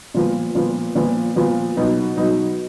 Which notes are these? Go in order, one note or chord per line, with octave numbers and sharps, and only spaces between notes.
A#2 F3 B3
A#2 F3 B3
A#2 F3 B3
A#2 F3 B3
B2 F#3 B3 D#4
B2 F#3 B3 D#4